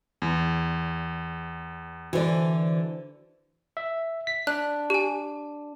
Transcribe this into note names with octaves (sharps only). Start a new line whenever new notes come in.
E2
D3 E3 F#4 C5 D5
E5
B6
D4 F#6
G4 G#5